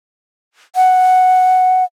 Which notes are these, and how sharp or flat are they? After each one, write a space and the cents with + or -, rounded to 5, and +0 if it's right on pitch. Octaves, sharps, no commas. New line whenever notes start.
F#5 +0